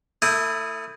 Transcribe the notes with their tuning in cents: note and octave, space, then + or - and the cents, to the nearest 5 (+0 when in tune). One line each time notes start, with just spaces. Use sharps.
A3 +35 E4 +0 D#6 +0